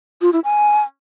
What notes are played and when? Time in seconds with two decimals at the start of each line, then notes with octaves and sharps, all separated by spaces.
0.22 F4
0.33 E4
0.44 G#5